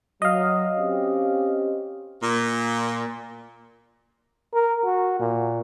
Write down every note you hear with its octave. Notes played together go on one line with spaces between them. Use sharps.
F#3 D#5 F5
C4 C#4 G4
A#2
A#4
F#4
A#2